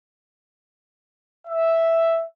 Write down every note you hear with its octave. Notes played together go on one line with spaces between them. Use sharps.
E5